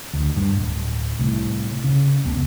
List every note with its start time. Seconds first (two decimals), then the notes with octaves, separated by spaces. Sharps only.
0.13 D2
0.36 G2
0.55 D1
1.19 C2 A2
1.84 C#3
2.25 F1 C#2 B3